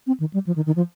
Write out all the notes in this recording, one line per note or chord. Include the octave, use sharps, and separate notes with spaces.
C4
D#3
G3
F3
D#3
D#3
F3